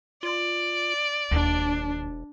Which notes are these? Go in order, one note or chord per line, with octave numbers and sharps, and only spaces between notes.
F4 D5
E1 D#2 D4